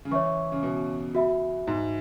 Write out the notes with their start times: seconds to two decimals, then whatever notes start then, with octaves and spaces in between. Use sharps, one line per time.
0.05 C#3
0.11 E3 C#5 E5 C#6
0.52 C#3
0.63 B2
1.15 F#4 E5 B5
1.67 G#2